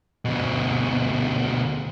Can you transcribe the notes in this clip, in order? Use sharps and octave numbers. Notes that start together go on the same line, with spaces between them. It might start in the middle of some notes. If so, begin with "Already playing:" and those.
D2 B2